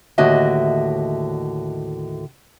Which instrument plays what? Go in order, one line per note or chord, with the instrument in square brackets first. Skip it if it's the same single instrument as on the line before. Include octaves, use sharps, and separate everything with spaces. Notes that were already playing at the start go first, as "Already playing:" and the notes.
[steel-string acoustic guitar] D#2 A2 D3 F#4 D#5 E5